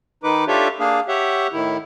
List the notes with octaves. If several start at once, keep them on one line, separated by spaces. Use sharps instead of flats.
D#3 D#4 B4 D6
D4 F4 G4 A4 C#5 E5
A#3 D4 G#4 F5
G4 C#5 E5 F#5
A2 D#3 E4